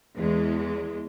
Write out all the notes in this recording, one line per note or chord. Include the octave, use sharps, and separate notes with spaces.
E2 G#3